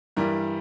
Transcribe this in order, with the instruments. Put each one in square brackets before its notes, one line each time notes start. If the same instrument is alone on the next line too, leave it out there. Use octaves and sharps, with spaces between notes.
[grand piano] G2 E3 G3 A#4